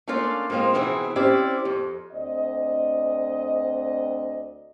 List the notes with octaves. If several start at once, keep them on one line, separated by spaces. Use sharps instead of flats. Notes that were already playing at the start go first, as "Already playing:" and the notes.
A3 A#3 C#4 D4 F4 D5
F3 G#3 A#3 C4 F4
B2 E3 C4 E4 G#4
C4 C#4 E4 G4 C5 D5
F2
D2 C4 D5 D#5